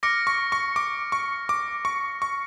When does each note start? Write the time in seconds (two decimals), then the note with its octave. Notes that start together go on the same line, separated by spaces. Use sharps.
0.03 D6 F6 A#6 C#7
0.27 C#6
0.52 C#6
0.76 D6
1.12 C#6
1.49 D6
1.85 C#6
2.22 C#6